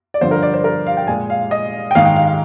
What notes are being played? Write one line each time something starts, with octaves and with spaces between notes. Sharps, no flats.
D5
G2 D3 F3 C5
A#4
D5
C5
A#4
F5
G5
A#2 G#3 G#5
F5
D#5
G5
G#2 D#3 G#3 F5
G5
F5
F5